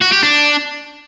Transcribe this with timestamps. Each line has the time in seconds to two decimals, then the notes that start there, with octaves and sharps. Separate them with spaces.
0.02 F#4
0.12 G4
0.23 D4